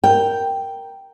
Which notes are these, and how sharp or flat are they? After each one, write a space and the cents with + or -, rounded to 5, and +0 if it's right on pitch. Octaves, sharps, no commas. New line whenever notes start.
A#4 +0 G5 +0